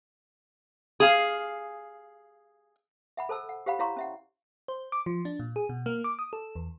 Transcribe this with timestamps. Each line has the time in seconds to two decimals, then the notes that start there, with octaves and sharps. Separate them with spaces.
1.00 G#4 F5
3.17 E5 F#5 B5
3.29 A4 C5 A5 E6
3.49 F#5
3.66 G4 C5 F5 F#5 B5
3.79 E4 C#5 F5 A#5 C6 C#6
3.96 C#4 E5 F#5
4.68 C5
4.92 D6
5.06 F3
5.25 D4
5.39 A#2
5.56 G#4
5.69 B2
5.86 A#3
6.04 D6
6.19 D#6
6.33 A4
6.56 E2